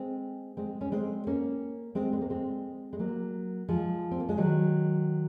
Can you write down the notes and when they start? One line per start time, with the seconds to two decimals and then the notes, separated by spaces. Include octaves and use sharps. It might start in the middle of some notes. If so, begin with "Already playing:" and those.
Already playing: G#3 C4
0.57 G#3 C4
0.81 C#4
0.92 G#3 C4
1.27 A#3 C#4
1.95 G#3 C4
2.13 G#3
2.21 A#3
2.30 G#3 C4
2.93 G#3
2.99 F#3 A#3
3.68 F3 G#3
4.11 C4
4.20 A#3
4.29 G#3
4.37 D#3 F#3